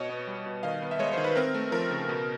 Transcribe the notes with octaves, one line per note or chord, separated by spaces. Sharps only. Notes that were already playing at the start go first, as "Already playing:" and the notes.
Already playing: B2 C#5 D#5
B3
G3
B2
D#3 D#5 F5
B3
E5
G#3 C#5 D#5
D#3 C5
B4
C4 A#4
A3
F3 A#4
C#3
B2